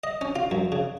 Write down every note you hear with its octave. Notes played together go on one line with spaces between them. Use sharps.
D#5
C#4
F4
F#2
C#3